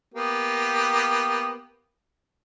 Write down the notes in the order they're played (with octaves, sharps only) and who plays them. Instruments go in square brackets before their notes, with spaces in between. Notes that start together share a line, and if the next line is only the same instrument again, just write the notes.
[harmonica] A#3 B3 G4